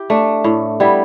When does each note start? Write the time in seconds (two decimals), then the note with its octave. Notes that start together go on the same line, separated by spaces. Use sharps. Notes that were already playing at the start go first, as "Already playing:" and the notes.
Already playing: E4 G4
0.10 A3 D4
0.44 A2
0.80 G3 B3 E4